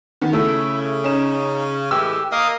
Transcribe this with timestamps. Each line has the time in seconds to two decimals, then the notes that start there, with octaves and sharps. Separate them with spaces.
0.21 D#3 B3
0.33 C#3 A3 E4 E5
1.04 C#4 D#4 E7
1.91 A2 E3 G#3 G4 E6
2.32 A#3 D#5 F5 D#6